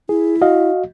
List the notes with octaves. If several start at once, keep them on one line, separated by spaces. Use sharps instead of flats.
E4 G#4
F#4 D#5 F5